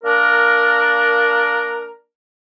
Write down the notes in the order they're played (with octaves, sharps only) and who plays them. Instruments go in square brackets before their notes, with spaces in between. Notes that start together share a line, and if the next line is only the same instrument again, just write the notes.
[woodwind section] A#3 D4 A#4